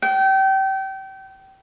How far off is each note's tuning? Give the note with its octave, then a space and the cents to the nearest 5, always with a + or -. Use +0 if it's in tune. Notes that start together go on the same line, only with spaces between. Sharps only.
G5 -30